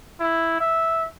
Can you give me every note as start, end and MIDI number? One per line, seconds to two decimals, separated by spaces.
0.20 0.56 64
0.60 1.06 76